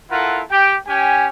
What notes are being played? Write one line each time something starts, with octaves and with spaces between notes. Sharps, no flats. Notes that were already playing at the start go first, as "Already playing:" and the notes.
E4 F4 A4 A#4 F#5
G4 G5
C#4 G4 G5 G#5